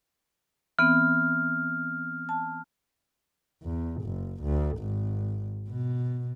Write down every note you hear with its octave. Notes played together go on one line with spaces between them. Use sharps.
E3 B3 C4 F6
A5
E2
F#1
D2
G#1
B2